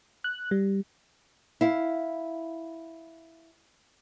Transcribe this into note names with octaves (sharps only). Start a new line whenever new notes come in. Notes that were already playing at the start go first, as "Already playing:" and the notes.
F#6
G3
E4 F5